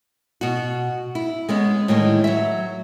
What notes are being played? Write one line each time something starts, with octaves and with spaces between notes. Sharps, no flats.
B2 F#4
E4
G#3 B3 C#4
A2 D#3 E3 G3 G#3
F#3 E5